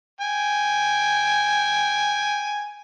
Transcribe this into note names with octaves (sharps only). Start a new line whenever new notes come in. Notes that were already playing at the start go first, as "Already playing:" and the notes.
G5 G#5